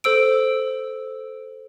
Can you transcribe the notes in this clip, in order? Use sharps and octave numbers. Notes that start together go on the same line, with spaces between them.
A4 C5 E6 D7